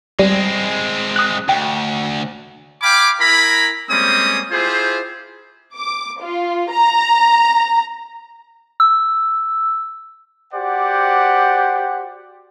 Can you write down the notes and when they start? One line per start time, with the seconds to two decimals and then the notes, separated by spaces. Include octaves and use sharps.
0.19 G3 G#3 C4
1.16 D#6 F#6
1.49 D2 G5
2.82 F5 G5 G#5 B5 D6
3.19 E4 A#4 G#5 A#5 B5
3.89 G3 G#3 A#3 C4 C#4 D#6
4.52 E4 F4 G4 G#4 C5
5.75 D6
6.21 F4
6.70 A#5
8.80 E6
10.53 F#4 G4 C5 D5 F#5